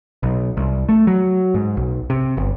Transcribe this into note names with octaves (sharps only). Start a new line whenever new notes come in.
B1
C2
A3
F#3
G#2
B1
C3
G1